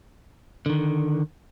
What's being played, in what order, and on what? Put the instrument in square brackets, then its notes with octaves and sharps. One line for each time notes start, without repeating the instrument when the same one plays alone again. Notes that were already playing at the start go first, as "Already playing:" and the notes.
[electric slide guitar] D3 D#3